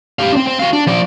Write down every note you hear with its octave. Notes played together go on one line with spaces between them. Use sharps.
G4 F5
C4 D4
C4
F#4 F5
D4
F3 D5